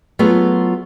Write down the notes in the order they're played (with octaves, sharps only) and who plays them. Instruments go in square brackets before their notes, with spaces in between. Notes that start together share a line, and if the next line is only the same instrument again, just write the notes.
[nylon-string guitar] F#3 A3 B3 F4 G#4